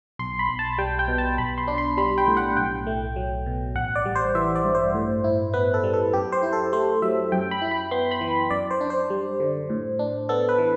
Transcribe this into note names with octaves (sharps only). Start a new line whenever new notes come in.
B1 C6
B5
B1
A5
G3 G5
G5
B2
A5
B1 B5
C6
D4
C6
G3 B5
G5
A2
F#5
B1 G5
A3
F#3
B2
A1 F#5
D5
G3
C5
E3 E5
D5
G2
C5
A2
E4
B3 B4
A4
G3
A4
F#2 G4
C5
E4
A4
A3 C5
F#3 E5
F#2 G5
B5
E4
B5
B3 C6
B5
E3
F#2 D5
C5
D4
C5
G3
D3
A2
D4
B3 A4
B4
E3